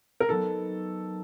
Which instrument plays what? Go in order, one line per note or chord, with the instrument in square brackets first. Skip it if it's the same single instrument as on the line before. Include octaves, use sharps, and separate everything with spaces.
[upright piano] A#4
[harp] F#3 B3 D#4 [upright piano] A4